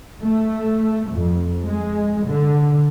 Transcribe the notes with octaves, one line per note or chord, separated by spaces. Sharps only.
A3
F2
G#3
D3